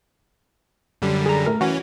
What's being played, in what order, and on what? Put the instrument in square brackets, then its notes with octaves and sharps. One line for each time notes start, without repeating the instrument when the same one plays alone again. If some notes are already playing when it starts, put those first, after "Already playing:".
[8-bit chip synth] F#2 D3 G3
[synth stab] G#4 A#5
A2 A#4
[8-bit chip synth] E3 C#4 [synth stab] F#4